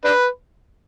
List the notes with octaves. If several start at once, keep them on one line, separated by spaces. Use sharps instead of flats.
D4 B4